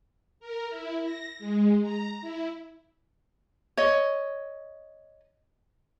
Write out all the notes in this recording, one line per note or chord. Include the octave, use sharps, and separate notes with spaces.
A#4
E4
A#6
G#3
A#5
E4
C#5 D#5